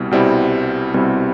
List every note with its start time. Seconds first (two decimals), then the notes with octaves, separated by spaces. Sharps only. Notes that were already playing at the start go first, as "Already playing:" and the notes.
Already playing: C2 B2 G3 C4 E4
0.11 C2 B2 G3 C4 E4
0.94 C2 B2 G3 C4 E4